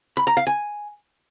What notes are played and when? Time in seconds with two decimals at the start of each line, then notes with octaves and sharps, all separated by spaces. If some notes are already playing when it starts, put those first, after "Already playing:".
0.17 B5
0.27 A#5
0.37 F5
0.47 G#5